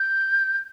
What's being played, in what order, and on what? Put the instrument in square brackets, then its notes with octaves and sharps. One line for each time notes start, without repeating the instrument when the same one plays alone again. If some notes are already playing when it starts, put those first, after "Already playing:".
Already playing: [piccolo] G6